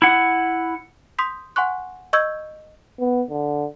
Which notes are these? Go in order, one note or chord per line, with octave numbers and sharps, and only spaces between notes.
E4 F#5
C6 D#6 G6 B6
F#5 G#5 C6 C#6 F#6
D#5 C#6 E6 G6 G#6
B3
D3